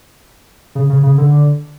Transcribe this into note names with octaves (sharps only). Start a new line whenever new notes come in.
C#3
C#3
C#3
D3